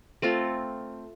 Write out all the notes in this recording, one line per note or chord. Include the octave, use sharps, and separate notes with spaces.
A3 C4 F4 A4